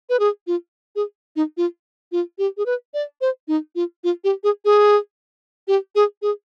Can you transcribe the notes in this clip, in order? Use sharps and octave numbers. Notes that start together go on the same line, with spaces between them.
B4
G#4
F4
G#4
D#4
F4
F4
G4
G#4
B4
D5
C5
D#4
F4
F4
G4
G#4
G#4
G4
G#4
G#4